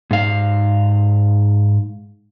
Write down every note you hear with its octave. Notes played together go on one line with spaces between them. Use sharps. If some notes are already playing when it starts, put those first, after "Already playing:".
G#2 F5